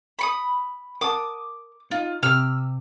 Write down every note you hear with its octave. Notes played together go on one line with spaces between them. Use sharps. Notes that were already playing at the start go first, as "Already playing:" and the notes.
B5 C#6 D#6
A#4 F#5 A5 D6 D#6
D#4 F4
C3 G4 E6 F6